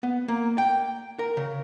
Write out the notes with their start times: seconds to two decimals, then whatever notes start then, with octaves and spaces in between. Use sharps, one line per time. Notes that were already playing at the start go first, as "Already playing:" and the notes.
0.03 B3
0.28 A#3
0.58 G5
1.19 A#4
1.37 C#3